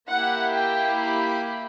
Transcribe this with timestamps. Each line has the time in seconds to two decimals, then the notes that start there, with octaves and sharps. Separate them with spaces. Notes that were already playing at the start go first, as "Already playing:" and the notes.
0.10 A#3 E4 G4 F#5
0.55 G5
1.00 B5